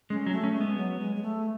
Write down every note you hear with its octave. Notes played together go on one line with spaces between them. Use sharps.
G#3 C#4
F#3
A3
C#4
G#3
B3
F#3
G#3
G#3
A3